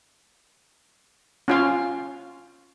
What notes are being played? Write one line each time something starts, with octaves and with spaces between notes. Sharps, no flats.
C#4 F4 F5